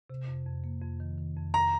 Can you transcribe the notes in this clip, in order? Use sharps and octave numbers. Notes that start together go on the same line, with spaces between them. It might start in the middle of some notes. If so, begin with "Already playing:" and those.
C3
F2
F2
A#3
F2
D#3
D#3
F2
A#5